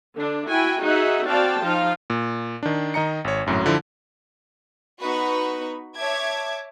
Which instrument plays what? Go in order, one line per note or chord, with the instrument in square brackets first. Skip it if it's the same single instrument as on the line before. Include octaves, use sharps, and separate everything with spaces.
[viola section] D3 D4
E4 F#4 G5 G#5
D#4 F#4 G#4 E5 F#5
C4 F#4 D5 F5 G5 A5
F3 D#4 F4 F5
[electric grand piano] A#2
D#3 D4
D#3 D#5 A#5 C#7
G#1 C#5
G#1 F#2 A2 F#3
D3 F3 E4
[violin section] B3 D#4 F#4 B4 B5 C#6
C#5 E5 A5 D6 G#6